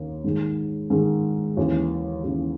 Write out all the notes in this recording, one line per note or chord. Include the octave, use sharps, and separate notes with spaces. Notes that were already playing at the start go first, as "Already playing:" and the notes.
Already playing: D#2 D#3 A#3
G#2 D#3 G#3
G#2 D#3 G#3
D#2 C#3 E3
D#2 C#3 E3